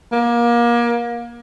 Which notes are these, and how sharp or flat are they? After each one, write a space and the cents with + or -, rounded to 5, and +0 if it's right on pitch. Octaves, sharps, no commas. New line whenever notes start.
A#3 +30